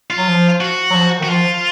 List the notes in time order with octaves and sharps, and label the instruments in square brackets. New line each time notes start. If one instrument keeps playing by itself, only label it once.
[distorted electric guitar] F4
[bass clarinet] F#3
F3
[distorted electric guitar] F#4
[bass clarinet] F#3
F3
[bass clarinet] D#3 [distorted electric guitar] F#4
[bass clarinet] F3 [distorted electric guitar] F4